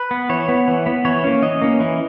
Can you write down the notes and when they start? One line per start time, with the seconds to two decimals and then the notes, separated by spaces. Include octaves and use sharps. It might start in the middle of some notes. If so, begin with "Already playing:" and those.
Already playing: B4
0.11 B3
0.29 E3 C#5
0.48 B3
0.68 E3
0.86 B3
1.05 E3 C#5
1.24 A#3 C#4
1.42 E3 D#5
1.62 A#3 C#4
1.80 E3